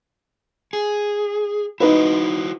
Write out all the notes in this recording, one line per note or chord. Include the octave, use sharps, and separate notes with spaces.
G#4
D#4 E4 F#4 B4 C5